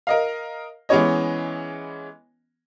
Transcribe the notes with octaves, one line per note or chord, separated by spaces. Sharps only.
A#4 D#5 F5
E3 G#3 B3 C#4 C#5 D#5